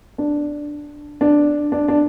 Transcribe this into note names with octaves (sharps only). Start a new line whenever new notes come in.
D4
D4
D4
D4